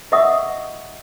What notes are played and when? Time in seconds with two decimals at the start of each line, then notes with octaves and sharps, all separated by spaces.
0.12 A#4 D#5 E5 F#5 C#6 D#6